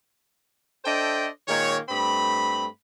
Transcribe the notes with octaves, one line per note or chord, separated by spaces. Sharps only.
D4 A4 C5 D#5 E5 G5
A#2 D#3 G#3 A#3 C#5
G2 A3 C4 B5